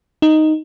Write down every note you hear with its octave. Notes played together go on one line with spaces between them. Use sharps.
D#4